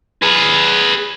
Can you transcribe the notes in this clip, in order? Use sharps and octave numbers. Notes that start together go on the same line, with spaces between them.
G#4 B4